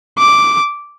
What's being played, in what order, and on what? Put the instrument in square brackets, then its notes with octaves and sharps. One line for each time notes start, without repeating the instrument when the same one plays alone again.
[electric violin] D6